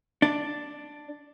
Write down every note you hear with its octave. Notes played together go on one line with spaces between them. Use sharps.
D4